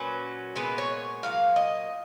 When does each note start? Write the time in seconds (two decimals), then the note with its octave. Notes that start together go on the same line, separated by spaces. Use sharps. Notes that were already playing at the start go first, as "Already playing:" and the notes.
Already playing: A#2 F#3 C#4 B4
0.55 A#2 G#3 B3 B4
0.78 C#5
1.23 A#2 F#3 F5
1.56 D#5